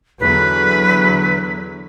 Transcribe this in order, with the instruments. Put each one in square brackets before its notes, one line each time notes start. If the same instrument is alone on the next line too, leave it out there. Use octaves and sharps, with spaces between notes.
[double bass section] E2 D3 F#3 [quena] B4